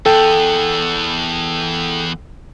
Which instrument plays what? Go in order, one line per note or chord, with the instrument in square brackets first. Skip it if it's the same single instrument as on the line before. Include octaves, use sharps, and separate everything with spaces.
[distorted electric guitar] E2 B3 [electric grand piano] A4 G5